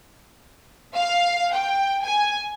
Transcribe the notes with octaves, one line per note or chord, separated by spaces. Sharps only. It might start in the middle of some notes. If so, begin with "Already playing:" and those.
F5
G5
G#5